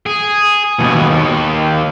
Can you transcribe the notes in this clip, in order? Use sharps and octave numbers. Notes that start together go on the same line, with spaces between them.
G#4
D#2 B2
D#2